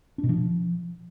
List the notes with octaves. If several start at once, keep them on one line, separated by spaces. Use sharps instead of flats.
D4
B2
F3